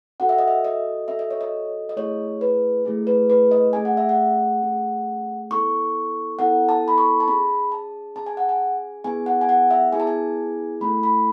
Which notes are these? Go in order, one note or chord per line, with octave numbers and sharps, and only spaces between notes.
C#4 F#4 A4 F#5
E5
D#5
E5
D#5
C#4 F#4 A4 E5
D#5
C#5
D#5
D#5
A3 E4 G#4 C#5
B4
A3 E4 G#4
B4
B4
D#5
A3 C#4 G#4 G#5
F#5
E5
F#5
A3 C#4 G#4
B3 E4 A4 C#6
B3 E4 A4 F#5
A5
B5
C#6
A5
C#4 G#4 B5
A5
C#4 G#4 A5
G#5
F#5
G#5
B3 E4 G#4 G#5
F#5
G#5
F#5
E5
B3 E4 G#4 G#5
A5
G#5
A3 C#4 E4 A4 B5
B5